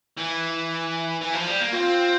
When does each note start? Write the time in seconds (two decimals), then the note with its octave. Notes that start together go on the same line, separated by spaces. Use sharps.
0.18 E3
1.21 E3
1.33 F3
1.47 G3
1.60 A#3
1.72 C4 F4